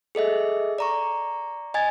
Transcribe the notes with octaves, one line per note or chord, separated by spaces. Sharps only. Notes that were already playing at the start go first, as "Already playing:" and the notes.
G#4 A4 D#5 E5
D5 A#5 C#6
D#5 G#5 G#6 A6